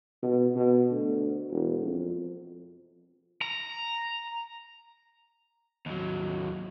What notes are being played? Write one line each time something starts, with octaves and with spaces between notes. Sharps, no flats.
B2
B2
D2
E1
F2
A#5
D#2 F#3